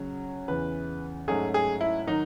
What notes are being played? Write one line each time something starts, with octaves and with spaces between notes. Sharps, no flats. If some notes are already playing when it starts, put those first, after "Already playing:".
Already playing: C#3 F#3 C#4
E2 C#3 E3 B4
G#2 F#3 A3 C#4 G#4
G#4
E4
D#3 F#3 D#4